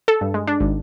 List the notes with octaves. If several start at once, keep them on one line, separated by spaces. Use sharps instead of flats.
A4
G2
G#3
D4
G#1